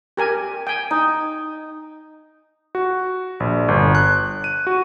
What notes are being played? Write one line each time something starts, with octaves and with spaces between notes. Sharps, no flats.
G4 A#4 G#5
G5 G#5
D#4
F#4
A#1
G1
F#6
D#7
F#4